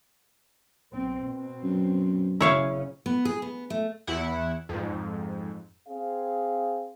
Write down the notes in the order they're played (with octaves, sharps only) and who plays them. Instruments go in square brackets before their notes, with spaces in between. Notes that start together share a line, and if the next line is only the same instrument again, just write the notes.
[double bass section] B1 C4
B2 C4
[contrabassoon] F#2
[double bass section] F#1 C#3 C#4 [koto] E4 C#5 F5
[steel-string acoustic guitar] B3
G#4
B3
A3
[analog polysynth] E2 E4 F#5
F2 G#2
[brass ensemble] C4 G#4 F5